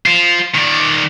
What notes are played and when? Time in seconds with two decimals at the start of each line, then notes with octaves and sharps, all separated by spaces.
0.06 F4 C5
0.55 D#3 D5